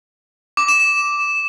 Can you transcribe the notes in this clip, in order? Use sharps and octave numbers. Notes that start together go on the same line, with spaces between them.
D6
E7
E7